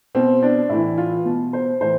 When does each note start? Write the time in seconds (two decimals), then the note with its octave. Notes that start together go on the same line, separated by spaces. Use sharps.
0.15 B2 C4
0.43 D4
0.69 A2 E3 E4
0.98 F4
1.25 B2
1.53 C5
1.81 A2 E3 C5